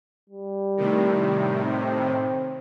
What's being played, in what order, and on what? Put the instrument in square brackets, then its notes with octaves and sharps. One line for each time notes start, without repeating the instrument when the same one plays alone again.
[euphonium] G3
[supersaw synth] A2 C3 D#3
[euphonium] C4